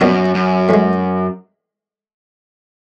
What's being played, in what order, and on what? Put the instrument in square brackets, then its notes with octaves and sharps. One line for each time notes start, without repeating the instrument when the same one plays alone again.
[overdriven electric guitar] F#2 [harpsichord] A#2 F#3 B3 D#4 F#4
[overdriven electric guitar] F#2
[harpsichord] A2 E3 G#3